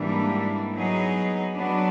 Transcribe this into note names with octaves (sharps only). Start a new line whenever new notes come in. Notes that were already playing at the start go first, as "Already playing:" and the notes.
Already playing: G#2 E3 G3 A#3 D4
F#3 B3 D#4 G#4
F#3 B3 D4